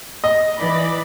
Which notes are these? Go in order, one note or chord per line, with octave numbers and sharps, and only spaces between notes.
D#5
E3 D5 B5